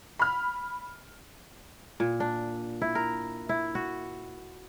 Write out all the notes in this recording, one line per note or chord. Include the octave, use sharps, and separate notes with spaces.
B5 F6
A#2
D4
E4
A#4
E4
F#4